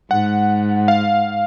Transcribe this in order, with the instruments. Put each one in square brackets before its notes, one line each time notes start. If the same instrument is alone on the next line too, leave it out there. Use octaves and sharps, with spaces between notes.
[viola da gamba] G#2 [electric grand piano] F#5
[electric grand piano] F5